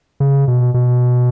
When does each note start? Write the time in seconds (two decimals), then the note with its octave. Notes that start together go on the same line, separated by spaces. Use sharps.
0.20 C#3
0.48 B2
0.74 B2